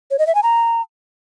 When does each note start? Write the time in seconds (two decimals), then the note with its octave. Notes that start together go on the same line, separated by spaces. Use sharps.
0.11 C#5
0.19 D#5
0.27 E5
0.35 G#5
0.43 A#5